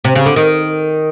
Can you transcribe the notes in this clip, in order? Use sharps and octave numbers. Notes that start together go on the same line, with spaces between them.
C3
C#3
D3
D#3